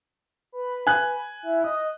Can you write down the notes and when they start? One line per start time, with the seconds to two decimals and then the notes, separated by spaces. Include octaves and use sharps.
0.52 B4
0.87 G#5 F#6
1.43 E4
1.64 D#5